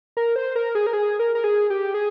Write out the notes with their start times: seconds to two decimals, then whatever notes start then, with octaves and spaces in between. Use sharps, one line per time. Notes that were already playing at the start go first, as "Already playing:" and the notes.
0.17 A#4
0.36 C5
0.56 A#4
0.75 G#4
0.87 A#4
0.93 G#4
1.19 A#4
1.35 A#4
1.44 G#4
1.70 G4
1.94 G#4